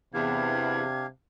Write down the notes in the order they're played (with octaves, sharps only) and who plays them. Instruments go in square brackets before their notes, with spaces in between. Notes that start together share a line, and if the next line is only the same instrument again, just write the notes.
[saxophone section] E2 [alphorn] C3 [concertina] D4 G4 F5 [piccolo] G#6